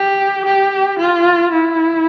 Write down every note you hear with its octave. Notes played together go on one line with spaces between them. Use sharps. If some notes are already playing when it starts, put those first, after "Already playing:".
Already playing: G4
G4
F4
E4